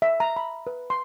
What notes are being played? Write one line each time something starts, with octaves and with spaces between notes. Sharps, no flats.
E5
A#5
B5
B4
C6